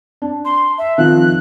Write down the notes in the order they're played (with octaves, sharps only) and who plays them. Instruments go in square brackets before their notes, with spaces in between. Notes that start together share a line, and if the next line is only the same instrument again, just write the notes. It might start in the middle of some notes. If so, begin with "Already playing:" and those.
[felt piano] D4
[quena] C6
E5
[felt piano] D#3 F3 C4 [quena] F#6